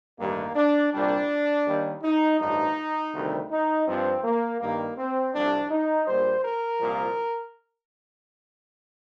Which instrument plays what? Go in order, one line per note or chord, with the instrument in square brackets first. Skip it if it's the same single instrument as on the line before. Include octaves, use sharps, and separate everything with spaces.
[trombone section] A1 G2 D#3 G3 A#3
D4
C2 A#2 G3 D4
D#2 D#3 G3
D#4
A1 G2 F3 D#4
D2 C3 D#3 G3
D#4
G2 F3 C4
A#3
G2 D#3 G3 A#3
C4
C2 C3 F3 D4
D#4
A#1 A#2 G3 C5
A#4
C2 A#2 F3